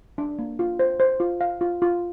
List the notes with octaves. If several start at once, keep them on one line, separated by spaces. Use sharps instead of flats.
D4
A#3
F4
C5
C5
F4
F5
F4
F4